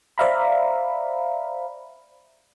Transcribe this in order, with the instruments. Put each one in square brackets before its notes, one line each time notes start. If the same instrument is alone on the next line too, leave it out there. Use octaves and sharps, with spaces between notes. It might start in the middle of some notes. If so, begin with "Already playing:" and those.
[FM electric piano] C5 D5 E5 F5 A#5 B5